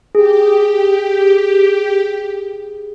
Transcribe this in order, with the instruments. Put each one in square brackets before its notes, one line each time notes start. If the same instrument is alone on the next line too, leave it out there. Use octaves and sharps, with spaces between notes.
[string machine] G4 [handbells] G#4